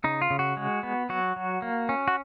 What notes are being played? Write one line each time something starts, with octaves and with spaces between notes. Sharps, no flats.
C#3 D#4
F4
C#3
F#4
G#3
B3
F#3 F#4
F#3
A#3
C#4
F#4